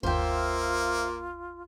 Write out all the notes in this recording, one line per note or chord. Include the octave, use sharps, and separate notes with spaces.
G1 D#2 A#3 F4 C5 E5 G5